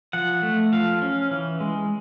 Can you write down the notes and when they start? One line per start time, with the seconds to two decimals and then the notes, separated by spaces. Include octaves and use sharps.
0.13 F3 F#5
0.42 A3
0.72 F3 F5
1.02 C#4
1.31 E3
1.61 G#3